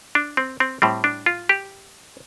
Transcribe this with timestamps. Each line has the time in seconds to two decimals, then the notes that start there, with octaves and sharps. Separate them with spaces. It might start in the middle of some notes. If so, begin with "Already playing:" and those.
0.15 D4
0.37 C4
0.60 C4
0.82 A2 G3 C4
1.04 D4
1.26 F4
1.49 G4